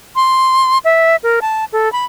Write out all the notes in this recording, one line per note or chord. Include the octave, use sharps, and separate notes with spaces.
C6
E5
A#4
A5
A4
B5